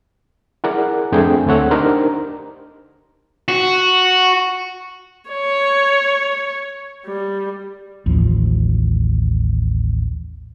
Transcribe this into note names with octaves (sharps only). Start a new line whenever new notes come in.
E4 G#4 A#4 D5 F#5
F2 A3 C4 D4 G#4 G5
D2 A3 C4 C#5 F#5 E6
D4 D#4 G4 A#4 C5
F#4
C#5
G3
A1 D#2 F3